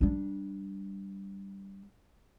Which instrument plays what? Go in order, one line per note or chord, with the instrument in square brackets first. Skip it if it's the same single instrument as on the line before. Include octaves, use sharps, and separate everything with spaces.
[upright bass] G3 D4